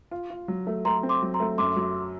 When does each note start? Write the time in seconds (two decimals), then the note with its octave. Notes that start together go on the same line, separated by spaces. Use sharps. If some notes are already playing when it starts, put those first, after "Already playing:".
0.11 F4
0.30 F4
0.48 F#3
0.67 A3
0.85 A3 A#5 C6
1.03 C4
1.09 C6 D6
1.22 F#3
1.34 A#5 C6
1.40 A3
1.58 F#2 C6 D6
1.76 F#3